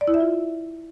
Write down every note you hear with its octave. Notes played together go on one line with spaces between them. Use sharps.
D5
E4
E5
F4